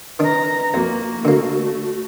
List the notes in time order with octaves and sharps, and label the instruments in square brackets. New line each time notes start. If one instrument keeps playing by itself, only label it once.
[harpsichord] D#3 D4 [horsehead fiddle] B4 A#5
[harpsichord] F2 [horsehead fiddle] A#3 [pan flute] F#4
[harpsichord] D3 A#3 [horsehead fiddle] A3